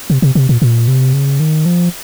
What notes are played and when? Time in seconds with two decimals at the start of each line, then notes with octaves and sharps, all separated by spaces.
0.10 C3
0.22 C3
0.35 C3
0.49 A#2
0.62 A#2
0.88 C3
1.13 C#3
1.40 D#3
1.66 F3